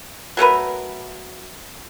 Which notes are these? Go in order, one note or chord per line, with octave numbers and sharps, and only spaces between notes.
F#3 A3 A#4 B4